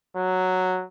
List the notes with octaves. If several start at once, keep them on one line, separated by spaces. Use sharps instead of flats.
F#3